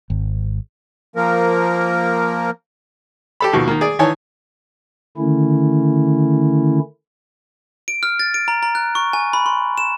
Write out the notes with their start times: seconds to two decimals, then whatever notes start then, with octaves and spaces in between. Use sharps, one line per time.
0.10 G#1
1.16 F3 A#3 A#4
3.40 G4 A4 B5
3.53 D#2 B2 F3
3.67 D#3 A#3
3.81 G#4 D5
3.99 D#3 E3 C#5 G#5 A5
5.18 D3 D#3 A3 C#4 E4
7.88 D7
8.03 F6
8.19 A6
8.34 D7
8.48 A#5
8.63 A#5
8.75 F#6
8.95 C#6
9.13 G#5
9.33 B5
9.46 C6
9.78 E7